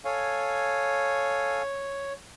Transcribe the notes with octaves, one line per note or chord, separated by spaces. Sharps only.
A4 C#5 F5 G#5